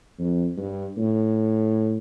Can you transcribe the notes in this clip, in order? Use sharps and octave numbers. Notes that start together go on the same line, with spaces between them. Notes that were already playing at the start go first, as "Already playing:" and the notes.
F2
G2
A2